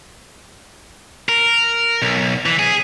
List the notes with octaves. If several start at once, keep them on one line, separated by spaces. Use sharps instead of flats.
A#4
B1
E3
G#4